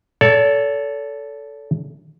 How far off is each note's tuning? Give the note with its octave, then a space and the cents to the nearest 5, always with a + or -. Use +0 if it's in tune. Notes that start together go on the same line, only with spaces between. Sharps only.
A4 +0 C#5 +45